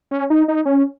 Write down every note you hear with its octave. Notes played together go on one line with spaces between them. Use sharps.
C#4
D#4
D#4
C#4